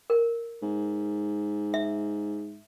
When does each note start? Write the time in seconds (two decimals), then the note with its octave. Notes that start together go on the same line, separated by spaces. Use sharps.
0.10 A#4
0.62 G#2
1.74 E5